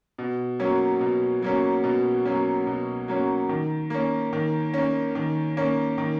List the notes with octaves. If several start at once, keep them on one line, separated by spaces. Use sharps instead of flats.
B2
F#3 A#3 C#4
B2
F#3 A#3 C#4
B2
F#3 A#3 C#4
B2
F#3 A#3 C#4
D#3
A#3 C#4
D#3
A#3 C#4
D#3
A#3 C#4
D#3